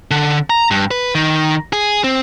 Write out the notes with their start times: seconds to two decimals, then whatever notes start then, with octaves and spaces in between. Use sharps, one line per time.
0.11 D3
0.50 A#5
0.71 G2
0.91 B4
1.15 D#3
1.73 G#4
2.04 C4